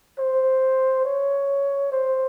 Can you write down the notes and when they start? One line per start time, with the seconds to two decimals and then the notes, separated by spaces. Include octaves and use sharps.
0.19 C5
1.05 C#5
1.92 C5